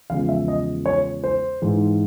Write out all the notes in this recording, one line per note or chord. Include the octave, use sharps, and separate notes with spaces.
E2 C#3 F3 G#3 F5
E5
D#5
C#5
C5
G#2 E3 G#3